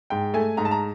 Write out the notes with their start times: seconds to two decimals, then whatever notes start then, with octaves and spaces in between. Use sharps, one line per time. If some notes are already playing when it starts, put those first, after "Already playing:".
0.10 G#2 G5
0.34 A3 G#5
0.57 G#2 A#5
0.65 A5
0.71 A#5